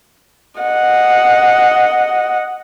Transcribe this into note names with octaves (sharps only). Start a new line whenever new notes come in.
D#5 F#5